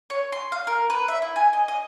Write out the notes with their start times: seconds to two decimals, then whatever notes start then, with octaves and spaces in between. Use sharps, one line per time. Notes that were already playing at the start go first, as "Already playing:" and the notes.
0.10 C#5
0.32 C6
0.52 F5
0.67 A#4
0.90 B4
1.08 E5
1.22 E4
1.36 G#5
1.53 D#5
1.68 D#5